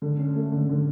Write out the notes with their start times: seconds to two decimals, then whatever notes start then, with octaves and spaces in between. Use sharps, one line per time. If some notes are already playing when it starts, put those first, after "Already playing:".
0.02 D3
0.19 C#4
0.35 A3
0.52 D3
0.69 D3